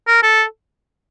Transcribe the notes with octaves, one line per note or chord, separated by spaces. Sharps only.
A#4
A4